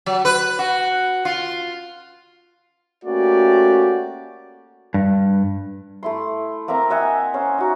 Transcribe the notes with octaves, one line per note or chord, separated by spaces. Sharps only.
F#3
B4
F#4
F4
A3 A#3 C#4 F#4 G4 D5
G2
A3 E4 C6
A#3 C4 E5 A#5
D#5 E5 F#5 G#5
C#4 C5
D#4 F#4